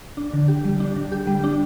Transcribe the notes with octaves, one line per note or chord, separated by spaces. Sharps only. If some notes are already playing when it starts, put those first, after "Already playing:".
D4
D3
G4
G3
D4
D3
G4
G3
D4